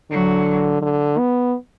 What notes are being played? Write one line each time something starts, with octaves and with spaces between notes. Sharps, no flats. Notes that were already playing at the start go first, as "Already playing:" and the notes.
D3 F#3
D3
B3